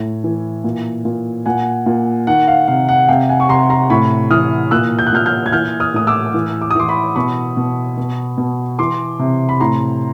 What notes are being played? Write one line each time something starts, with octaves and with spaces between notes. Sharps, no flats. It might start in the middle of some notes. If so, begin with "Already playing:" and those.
Already playing: A2
E3
A#2
A#2
A#2 F#5 G#5
A#2
D#3 F#5
F5
C3 F5
F#5
C3 F5 G5
F#5 G#5
C#6
C3 A#5 C6
A#5 C6
A2 B5 C#6
E3 D#6 F6
A#2 E6 F#6
G6
F#6
A#2 F6 G6
F6 G6
G#6
E3 F6 G6
D#6 F6
A2 D#6
D6 E6
E3
D6
D#6
E3 C6 D6
B5 C#6
B2 B5 C#6
B2
B2
B2
E3 C6 D6
C3
B5
A2 A#5 C6